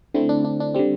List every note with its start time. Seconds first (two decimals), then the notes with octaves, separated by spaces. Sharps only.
0.14 D3 A3 C4 E4
0.29 D4
0.45 D4
0.60 D4
0.74 D3 G3 C4